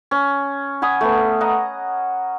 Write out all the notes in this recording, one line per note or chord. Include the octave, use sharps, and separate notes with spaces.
C#4
F#5 G#5 B5 D#6
A3 B3
D#5 F#5 A#5